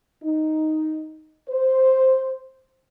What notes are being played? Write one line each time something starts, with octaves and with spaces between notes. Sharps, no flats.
D#4
C5